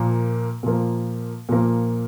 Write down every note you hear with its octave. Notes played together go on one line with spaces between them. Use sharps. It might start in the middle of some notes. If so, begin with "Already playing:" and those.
Already playing: A#2 F3 A#3
A#2 F3 A#3
A#2 F3 A#3